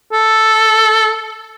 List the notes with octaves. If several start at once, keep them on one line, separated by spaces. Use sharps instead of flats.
A4